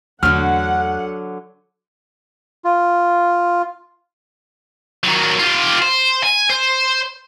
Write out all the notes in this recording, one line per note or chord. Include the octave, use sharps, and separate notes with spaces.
E2 D3 F#3 A3 A4 F#5 F6
F4
D#3 F#3
F4 G4
C5
G#5
C5